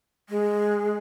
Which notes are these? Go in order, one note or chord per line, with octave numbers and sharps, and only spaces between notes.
G#3